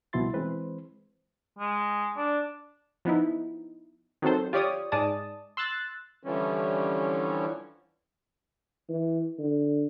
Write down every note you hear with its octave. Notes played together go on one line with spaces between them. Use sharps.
C2 B2 F3 E4 C6 A6
E3 G#3 C4 B4 C5
G#3
D4
F3 B3 D#4 E4
D#3 F#3 C4 A4 C5
F4 G4 C#5 D5 D#6
G#2 G#3 D5 A5 D#6
C6 E6 F#6 A6
D3 E3 F3 G3 C#4
E3
D3